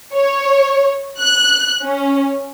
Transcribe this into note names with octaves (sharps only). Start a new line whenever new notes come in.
C#5
F#6
C#4